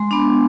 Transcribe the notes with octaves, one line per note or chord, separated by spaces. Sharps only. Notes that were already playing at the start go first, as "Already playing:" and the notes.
Already playing: G#3 C6
B3 D4